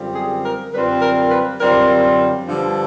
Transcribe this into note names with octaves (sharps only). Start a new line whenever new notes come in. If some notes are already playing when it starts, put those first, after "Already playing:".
Already playing: F#2 D3 G3 C4 F4
G#4
A#4
F#2 D3 G3 C4 F4 B4
A#4
B4
F#2 D3 G3 C4 F4 A#4
G2 D3 F3